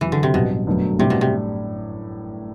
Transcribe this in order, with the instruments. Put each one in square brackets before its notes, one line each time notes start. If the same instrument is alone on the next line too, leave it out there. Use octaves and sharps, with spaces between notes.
[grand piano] F#1 F#2 F#3 [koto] E3
[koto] D3
C3
[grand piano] A1 G2 F#3 [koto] B2
[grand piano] G1 F#2 D3 F#3 A3
[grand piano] A2 G3 D4 [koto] C3
[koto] B2
C3